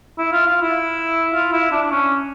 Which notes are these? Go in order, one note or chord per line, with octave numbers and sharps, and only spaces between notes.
E4
F4
F4
E4
F4
E4
D4
D4
C#4